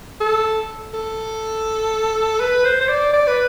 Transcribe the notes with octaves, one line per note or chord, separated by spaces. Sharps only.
A4
A4
B4
C5
C5
D5
D5
B4